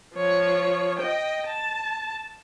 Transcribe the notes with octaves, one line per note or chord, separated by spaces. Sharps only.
F3 C#5
D#5 G5
A5